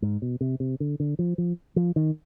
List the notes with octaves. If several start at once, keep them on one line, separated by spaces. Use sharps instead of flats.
G#2
B2
C3
C3
D3
D3
F3
F3
F3
D#3